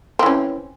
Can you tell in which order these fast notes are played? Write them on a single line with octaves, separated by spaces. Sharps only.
C4 E3 C#4